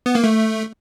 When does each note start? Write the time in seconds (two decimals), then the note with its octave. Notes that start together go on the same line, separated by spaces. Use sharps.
0.06 B3
0.15 A#3
0.24 A3